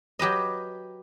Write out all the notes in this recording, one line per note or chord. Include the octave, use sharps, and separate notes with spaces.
F#3 G4 B4 D#5